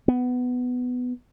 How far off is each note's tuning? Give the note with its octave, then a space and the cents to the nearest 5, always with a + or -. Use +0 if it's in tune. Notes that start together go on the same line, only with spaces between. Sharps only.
B3 +10